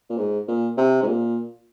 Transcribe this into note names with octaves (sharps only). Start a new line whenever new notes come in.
A#2
G#2
A#2
C3
G#2
A#2